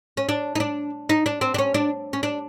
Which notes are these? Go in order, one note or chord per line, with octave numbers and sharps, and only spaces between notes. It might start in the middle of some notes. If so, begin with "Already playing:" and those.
C#4
D4
D#4
D4
D#4
D4
C4
D4
C#4
D4
C#4
D4